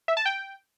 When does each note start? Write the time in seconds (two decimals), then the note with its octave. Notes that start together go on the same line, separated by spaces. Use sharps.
0.08 E5
0.17 A5
0.25 G5